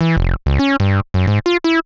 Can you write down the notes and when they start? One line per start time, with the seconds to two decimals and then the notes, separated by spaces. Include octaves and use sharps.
0.01 E3
0.17 F1
0.46 C#2
0.59 C#4
0.80 G2
1.14 F#2
1.27 G#2
1.46 F4
1.64 E4